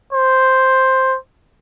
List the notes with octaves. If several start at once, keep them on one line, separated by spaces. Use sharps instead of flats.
C5